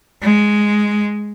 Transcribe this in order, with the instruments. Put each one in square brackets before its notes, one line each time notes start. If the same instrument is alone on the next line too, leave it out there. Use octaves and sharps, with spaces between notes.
[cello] G#3